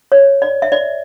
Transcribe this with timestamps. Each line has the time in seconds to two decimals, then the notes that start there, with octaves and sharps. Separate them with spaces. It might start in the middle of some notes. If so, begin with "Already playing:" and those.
0.12 C#5
0.42 D5
0.62 E5
0.72 D5